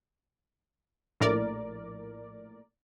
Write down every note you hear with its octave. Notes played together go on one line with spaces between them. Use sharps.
A#1 A2 A#4 D5